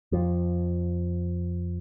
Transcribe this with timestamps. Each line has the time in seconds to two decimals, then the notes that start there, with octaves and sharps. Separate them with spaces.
0.12 F2 F3